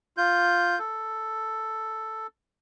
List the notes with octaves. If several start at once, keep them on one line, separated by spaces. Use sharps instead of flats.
F4 G6
A4